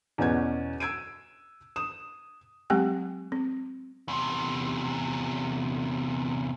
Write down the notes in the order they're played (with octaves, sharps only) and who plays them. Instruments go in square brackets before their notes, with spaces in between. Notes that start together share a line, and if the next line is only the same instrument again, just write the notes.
[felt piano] E2 B2 C#4 F#5 G#6
E6 G#6 D7 D#7
D#6 E7
[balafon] F#3 G#3 C4 G4 G5 G#5
C4
[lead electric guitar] E2 C3